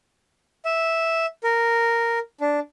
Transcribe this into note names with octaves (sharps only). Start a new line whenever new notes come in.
E5
A#4
D4